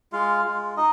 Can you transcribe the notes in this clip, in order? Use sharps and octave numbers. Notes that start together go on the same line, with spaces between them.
G#3 F4 F5
G#3 F4
D#4 D#5